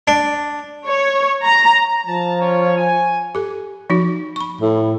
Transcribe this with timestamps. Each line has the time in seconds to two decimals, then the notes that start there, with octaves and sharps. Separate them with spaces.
0.08 D4
0.87 C#5
1.45 A#5
2.07 F3 A5 A#5
2.40 C#4 F4 C#5
2.76 G#5
3.35 G4 A4
3.90 F3 D#4 F#4
4.36 B5 C#6
4.61 A2